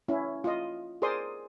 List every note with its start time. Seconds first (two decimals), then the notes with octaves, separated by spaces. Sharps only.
0.08 C#4 E4
0.44 F4 D#5
1.02 G#4 A#4 C5 D5 C6 D#6